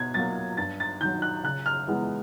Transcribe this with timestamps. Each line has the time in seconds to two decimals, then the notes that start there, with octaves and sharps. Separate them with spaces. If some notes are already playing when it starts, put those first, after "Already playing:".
Already playing: B2 G#6
0.14 F#3 A#3 A6
0.57 G2 A6
0.80 A6
1.00 D#3 G6
1.04 F#3
1.22 F#6
1.44 C#3 F#6
1.66 F6
1.88 E3 G#3 B3